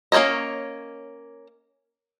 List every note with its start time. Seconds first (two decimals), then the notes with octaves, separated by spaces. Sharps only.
0.12 A#3 C#4 C5 C#5 D#5